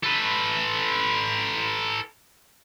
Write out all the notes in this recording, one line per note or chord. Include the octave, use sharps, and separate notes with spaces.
A4 B4